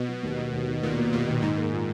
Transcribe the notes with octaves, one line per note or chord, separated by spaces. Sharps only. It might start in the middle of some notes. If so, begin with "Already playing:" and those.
Already playing: B2
F#3
D#2
A#3
D#2
D#3
D#2 A#2
A#3
D#2 A#2
D#3
G#2 D#4
A#3
A#2